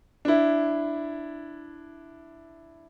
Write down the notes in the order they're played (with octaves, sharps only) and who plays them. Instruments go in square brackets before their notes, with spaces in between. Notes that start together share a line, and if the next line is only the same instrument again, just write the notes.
[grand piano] D4 E4